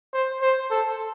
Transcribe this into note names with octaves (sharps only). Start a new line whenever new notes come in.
C5
C5
A4